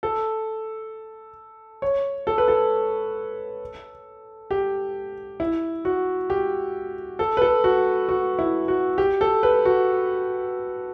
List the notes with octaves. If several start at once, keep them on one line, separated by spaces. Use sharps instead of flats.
A4
C#5
A4
B4
A4
G4
E4
F#4
G4
A4
B4
A4
F#4
F#4
E4
F#4
G4
A4
B4
F#4